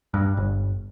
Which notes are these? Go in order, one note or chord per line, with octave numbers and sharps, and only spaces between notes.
G2
G1